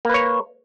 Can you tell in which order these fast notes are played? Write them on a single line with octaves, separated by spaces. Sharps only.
A#3 B4 C#5